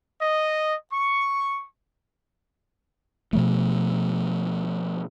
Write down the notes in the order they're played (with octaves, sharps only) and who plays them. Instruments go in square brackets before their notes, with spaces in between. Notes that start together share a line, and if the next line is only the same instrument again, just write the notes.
[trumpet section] D#5
C#6
[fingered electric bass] B2 F3 A3